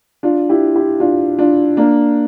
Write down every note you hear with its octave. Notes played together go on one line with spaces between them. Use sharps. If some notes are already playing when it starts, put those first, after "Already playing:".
D4 F4
E4 G4
E4 G4
D4 F4
D4 F4
A#3 D4